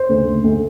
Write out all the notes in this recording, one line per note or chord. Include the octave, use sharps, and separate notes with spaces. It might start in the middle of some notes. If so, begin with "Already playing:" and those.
Already playing: C5
D2
D2
D2